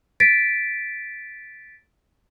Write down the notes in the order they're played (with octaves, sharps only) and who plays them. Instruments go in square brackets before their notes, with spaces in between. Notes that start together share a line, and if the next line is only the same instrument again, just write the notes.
[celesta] A6 B6 D7